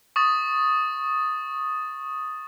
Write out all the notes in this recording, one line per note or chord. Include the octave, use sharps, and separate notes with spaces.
C#6 D#6 A6